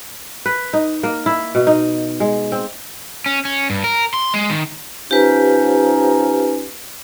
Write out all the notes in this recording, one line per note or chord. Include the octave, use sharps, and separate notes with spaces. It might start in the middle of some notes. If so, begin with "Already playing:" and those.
B4
D#4
A#3
E4
B2
D#4
G#3
C4
C#4
C#4
G2
A#4
C6
G#3
D#3
F3 C#4 D#4 G4 B4